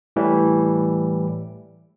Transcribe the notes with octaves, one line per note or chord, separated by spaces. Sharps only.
A2 E3 G3